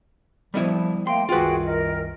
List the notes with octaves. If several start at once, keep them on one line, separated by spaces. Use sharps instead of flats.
F3 G3 B3 E4
A3 A#3 G5 C6
C2 F#2 D#3 F4 F#4 G#4 B4 G5
A#4 D#5